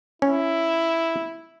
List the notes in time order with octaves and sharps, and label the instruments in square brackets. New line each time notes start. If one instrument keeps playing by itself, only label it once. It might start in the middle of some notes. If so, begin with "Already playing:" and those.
[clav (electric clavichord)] C#4 [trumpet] E4